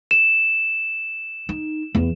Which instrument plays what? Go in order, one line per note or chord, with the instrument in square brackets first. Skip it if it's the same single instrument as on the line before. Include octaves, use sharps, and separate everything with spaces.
[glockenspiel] E7
[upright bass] D#4
E2